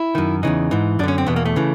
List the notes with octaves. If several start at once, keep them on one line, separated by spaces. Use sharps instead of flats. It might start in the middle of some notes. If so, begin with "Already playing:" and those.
Already playing: E4
F#2 D#3
E2 C#3 E3 D#4
G#2 E3
F#2 D3 C#4 D4
C4
E2 B2 B3
A#3
A3
C#3 E3